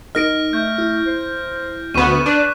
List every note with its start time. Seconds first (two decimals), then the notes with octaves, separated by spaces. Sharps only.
0.15 D#4 A#4 D#5 F6 A#6 D7
0.53 A3 G6
0.78 E4
1.07 C5
1.94 D2 B3 C#6 D#7
2.26 D4 B4